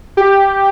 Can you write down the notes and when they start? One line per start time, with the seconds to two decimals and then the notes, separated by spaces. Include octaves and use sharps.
0.17 G4